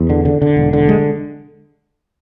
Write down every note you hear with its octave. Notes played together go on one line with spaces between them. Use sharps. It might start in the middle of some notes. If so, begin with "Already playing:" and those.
Already playing: E2
D3
D3
D3
E1
D3
G#3